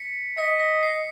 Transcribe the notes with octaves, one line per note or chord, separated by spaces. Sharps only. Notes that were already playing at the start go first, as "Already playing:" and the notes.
Already playing: B6 C#7
D#5 B6 C#7
B6
C7